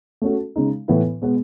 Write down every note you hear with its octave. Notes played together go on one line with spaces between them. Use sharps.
A3 C#4 F#4 A4
C#3 G#3 D#4
A2 E3 B3 E4 B4
B2 G#3 B3